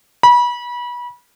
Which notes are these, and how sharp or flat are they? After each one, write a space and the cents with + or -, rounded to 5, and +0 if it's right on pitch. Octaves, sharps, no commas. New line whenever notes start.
B5 -30